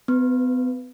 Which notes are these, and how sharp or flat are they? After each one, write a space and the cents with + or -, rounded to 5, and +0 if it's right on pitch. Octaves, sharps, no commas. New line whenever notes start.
B3 +40 B4 +0